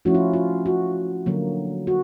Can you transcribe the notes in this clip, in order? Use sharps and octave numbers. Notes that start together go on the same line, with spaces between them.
F3 A3 C#4 E4 F#4
F4
F4
F#4
D3 F#3 A#3
F#4